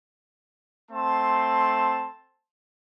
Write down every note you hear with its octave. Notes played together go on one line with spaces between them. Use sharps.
A3 C4 A5 C6